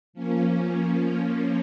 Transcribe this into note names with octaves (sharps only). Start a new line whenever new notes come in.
F3 A#3 C#4